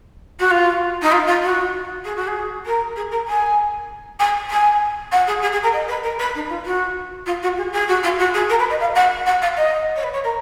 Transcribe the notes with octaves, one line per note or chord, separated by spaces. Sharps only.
F#4
F4
D#4
F4
F4
F#4
G#4
F#4
G#4
A#4
G#4
A#4
G#5
G#5
G#5
F#5
G#4
G#4
G#4
A#4
D#5
B4
A#4
B4
D#4
F4
F#4
F4
F#4
G#4
G#4
F#4
F4
F#4
G#4
A#4
B4
D#5
F5
F#5
F#5
F5
D#5
C#5
B4
C#5
A#4